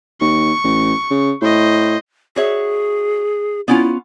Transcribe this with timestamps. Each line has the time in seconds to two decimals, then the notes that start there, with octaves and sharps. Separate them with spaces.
0.21 D#2 C#6
0.64 A1
1.11 C#3
1.42 A2 C5 D#5
2.36 F#4 G#4 C#5 E5
3.68 B3 C#4 E4 F4